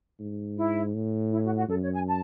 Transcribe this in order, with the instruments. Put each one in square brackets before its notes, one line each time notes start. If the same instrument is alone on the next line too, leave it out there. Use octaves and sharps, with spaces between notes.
[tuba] G#2
[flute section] E4
[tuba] A2
[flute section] E4
F#4
F#4
[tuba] F#2 [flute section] A4
[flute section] C#5
G#5
A5